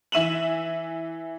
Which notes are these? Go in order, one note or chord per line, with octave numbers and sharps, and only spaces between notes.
E3 E5 D#7 E7 F#7